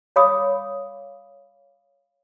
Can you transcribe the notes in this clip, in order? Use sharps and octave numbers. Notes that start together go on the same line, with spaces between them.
C#5 F5 B5 D6 D#6